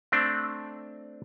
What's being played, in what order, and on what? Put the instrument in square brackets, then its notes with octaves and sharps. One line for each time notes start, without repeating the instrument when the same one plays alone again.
[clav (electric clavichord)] A3 C4 D4